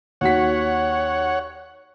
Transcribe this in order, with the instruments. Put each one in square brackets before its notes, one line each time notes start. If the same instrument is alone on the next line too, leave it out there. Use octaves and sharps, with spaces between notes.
[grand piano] D#2 F#4 B6 [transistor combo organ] C#5 F#5